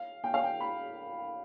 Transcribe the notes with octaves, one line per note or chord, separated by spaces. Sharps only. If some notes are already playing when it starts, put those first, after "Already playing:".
Already playing: F5
G5
F5
G5
B5